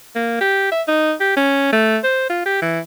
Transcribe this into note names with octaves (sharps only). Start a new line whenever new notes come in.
A#3
G4
E5
D#4
G4
C#4
A3
C5
F4
G4
E3